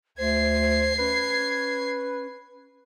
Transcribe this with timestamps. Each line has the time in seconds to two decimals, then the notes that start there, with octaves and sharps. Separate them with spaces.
0.18 D2 C5 G#6 C7
0.99 C#4 B4